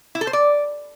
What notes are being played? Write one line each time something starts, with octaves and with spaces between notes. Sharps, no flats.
E4
A4
C5
D5